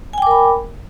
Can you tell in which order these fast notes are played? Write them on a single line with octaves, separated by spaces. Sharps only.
G#5 G5 D6 A#4 B5